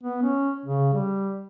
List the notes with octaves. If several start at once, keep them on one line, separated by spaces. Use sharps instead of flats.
B3
C#4
C#3
G3